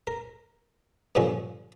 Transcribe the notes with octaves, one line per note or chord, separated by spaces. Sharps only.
A#4
G2 A#2 D3 F3 C#4